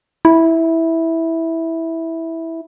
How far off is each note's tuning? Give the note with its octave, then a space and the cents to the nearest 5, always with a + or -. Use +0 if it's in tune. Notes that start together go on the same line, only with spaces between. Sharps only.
E4 -10